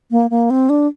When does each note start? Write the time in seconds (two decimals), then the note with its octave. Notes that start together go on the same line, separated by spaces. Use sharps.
0.11 A#3
0.30 A#3
0.50 C4
0.69 D4